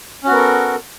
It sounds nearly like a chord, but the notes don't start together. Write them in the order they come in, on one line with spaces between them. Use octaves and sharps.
C#4 F#4 B3 A#4 A4